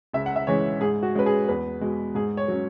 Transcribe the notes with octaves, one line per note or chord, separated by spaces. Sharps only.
C#2 E5
F#5
E5
C#3 E3 G#3 C#5
G#2 G#4
F#4
G#3 C#4 B4
G#4
E2 B4
B2 G#3
G#2 G#4
C#5
F#3 C#4